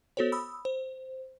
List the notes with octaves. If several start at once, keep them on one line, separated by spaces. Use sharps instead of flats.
B3 F#4 A4 C5 C#5
B5 D#6 E6
C5